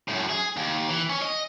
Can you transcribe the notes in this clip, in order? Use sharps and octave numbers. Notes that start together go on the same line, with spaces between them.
F#2 A2
G#4
D#2
E3
C#4
D#5